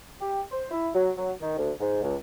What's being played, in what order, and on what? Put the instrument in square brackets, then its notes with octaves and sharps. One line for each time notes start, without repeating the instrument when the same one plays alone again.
[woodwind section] G4
C5
E4
F#3
F#3
D#3
D2
G#2
C#2